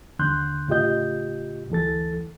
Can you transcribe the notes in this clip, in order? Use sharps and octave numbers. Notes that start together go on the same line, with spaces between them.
D#2 D3 C6 F#6 G6
A2 C#3 F4 G4 D#5 G6
D2 E3 A4 A6